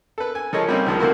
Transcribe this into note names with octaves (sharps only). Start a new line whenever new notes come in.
A4 B4
G#5
F3 G#3 A4 A#4 C#5 D#5
G3 A#3 C4 C#4 D#4
C#2 D#3 F3 G#3 A#4
F3 A3 A#3 C4 E4 F#4